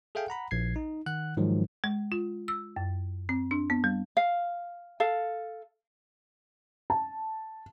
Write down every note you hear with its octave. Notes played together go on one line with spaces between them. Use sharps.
G#4 A4 E5 F5 G5 G#5
F#5 A#5 B5
A#1 G#6 C7
D#4
D#3 F#5 F#6
G#2 D#3 F3 F#3 G#3
G#3
F4
E6
F#2
C4
D4
B3
G3
F5
A4 F5
A5